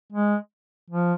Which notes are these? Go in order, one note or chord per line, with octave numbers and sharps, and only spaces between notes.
G#3
F3